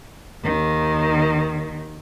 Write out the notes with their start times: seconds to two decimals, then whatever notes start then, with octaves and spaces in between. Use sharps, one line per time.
0.43 D#2 D#3